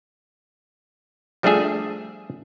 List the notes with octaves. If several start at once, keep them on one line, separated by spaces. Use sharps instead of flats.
F3 G3 A3 D4 G#4 E5